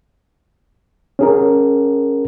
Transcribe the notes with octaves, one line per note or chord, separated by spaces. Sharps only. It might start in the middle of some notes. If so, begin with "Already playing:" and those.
C#4 G#4 A#4